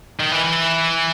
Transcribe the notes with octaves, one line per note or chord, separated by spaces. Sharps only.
D#3
E3